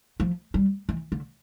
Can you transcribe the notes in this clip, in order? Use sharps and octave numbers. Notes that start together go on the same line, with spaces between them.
F3
G3
E3
D3